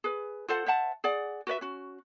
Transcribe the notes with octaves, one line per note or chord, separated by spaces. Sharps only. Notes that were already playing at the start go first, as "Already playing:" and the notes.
G#4 B4
F4 A4 C5 F#5
C5 E5 F#5 A5
G#4 D5 F#5
F#4 B4 D5 E5
C#4 F#4